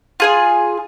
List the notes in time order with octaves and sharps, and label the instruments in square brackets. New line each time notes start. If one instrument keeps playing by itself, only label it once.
[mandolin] F4 G#4 G#5